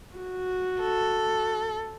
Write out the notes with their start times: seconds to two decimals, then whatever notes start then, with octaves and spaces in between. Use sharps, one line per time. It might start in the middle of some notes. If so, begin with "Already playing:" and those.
0.16 F#4
0.81 A4